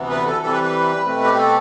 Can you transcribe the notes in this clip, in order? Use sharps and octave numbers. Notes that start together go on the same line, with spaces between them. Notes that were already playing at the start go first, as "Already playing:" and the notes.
Already playing: D2 C3 E3 B3
B4
A4
C3 E3 G3 A4
B4
B4
B2 A3 C4
G4
A4